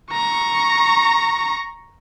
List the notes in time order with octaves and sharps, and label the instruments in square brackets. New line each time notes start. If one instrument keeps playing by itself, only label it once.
[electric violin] A#5 C#6